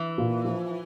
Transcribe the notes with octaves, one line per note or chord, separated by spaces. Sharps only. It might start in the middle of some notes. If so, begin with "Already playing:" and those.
Already playing: E3
A#2
F3